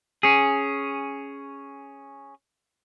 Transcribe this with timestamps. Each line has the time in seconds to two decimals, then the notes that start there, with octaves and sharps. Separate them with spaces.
0.23 C#4 G#4